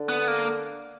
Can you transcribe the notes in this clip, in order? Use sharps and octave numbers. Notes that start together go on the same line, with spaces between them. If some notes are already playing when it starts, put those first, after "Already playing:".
Already playing: D3
B3
A#3